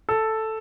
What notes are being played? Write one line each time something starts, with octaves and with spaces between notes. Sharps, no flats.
A4